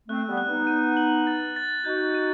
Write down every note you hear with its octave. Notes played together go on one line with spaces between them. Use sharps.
A3 C4 F#6
G3 B3
F#6
B3 D#4
D#7
F#7
A6
A6
D#4 F#4 G6
D#7